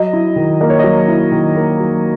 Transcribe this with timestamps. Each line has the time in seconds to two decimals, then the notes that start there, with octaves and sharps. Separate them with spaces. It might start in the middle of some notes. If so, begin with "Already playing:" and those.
Already playing: F#3 D#5
0.13 E4
0.36 D#3
0.61 A#3 D#5
0.70 C#5
0.79 F#3 D#5
1.08 E4
1.32 D#3
1.55 A#3
1.80 F#3